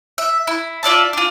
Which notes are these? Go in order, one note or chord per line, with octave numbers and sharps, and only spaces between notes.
E5
E4
F4 D5 E5 A5
D4 F4